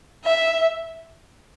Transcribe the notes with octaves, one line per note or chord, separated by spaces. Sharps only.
E5